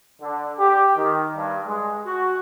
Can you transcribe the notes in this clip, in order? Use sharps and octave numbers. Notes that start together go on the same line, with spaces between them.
D3
G4
D#3
G2
G#3
F#4